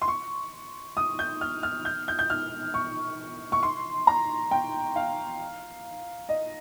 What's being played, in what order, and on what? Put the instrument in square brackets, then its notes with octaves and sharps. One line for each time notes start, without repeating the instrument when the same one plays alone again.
[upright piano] C6
C#6
D#6
G6
F6
F6
G6
G6
G6
F6
C#6
C#6
C6
A#5
G5
F5
D#5